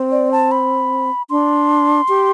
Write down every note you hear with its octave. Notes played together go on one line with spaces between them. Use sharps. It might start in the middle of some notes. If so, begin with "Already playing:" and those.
Already playing: C4
D5
A5
B5
D4 C6
G4